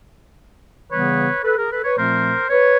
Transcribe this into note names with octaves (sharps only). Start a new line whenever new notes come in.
C#3 E3 G3 B3 B4 C#5
A4 B4
G#4 A#4
A4 B4
B4 C#5
A#2 F3 A3 C4 A#4 C5
B4 C#5